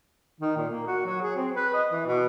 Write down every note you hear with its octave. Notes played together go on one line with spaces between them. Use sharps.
D#3
A#2
A#3
F#4
F#3
G#4
C4
B4
D#5
E3
B2